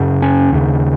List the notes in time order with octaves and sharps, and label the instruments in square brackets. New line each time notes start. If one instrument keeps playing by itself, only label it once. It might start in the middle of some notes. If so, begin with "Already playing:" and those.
Already playing: [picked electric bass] F#2 C#3
C#4
D#2 C#3